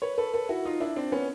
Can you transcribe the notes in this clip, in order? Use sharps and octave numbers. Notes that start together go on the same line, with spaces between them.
B4 C#5
A4 B4
A4 B4
E4 F#4
D#4 F4
D4 E4
C4 D4
B3 C#4